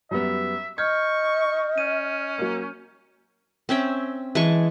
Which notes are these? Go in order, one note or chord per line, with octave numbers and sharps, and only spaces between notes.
F#2 G3 B3 E5
D#5 C#6 F6 G6 G#6
C#4 D#7
F#3 A#3
C4 C#4 E5 G5
E3 G#3 A5 C#6